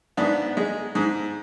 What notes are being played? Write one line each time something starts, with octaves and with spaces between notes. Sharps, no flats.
G#2 B3 D4
G#3
G#2